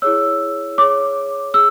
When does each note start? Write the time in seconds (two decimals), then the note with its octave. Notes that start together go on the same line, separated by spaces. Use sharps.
0.02 E4 G#4 C#5 E6
0.78 G#4 C#5 D6
1.54 G#4 E6